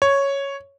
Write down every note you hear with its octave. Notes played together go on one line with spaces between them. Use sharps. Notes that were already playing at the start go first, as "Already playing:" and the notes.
C#5